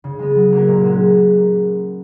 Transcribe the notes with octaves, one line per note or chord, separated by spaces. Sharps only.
C#3
G#3 B3
F#3
A#3 C#4 F#4 A#4
A#2
G#3 C#4 F#4